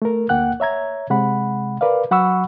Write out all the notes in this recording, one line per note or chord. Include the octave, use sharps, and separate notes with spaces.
A3 A#4
D2 A#3 F#5 G5 F#6
C#5 E5 A#5 G#6
C3 G#3 F#5 B5
A#4 B4 D5 F5
F#3 F#5 B5 C#6 E6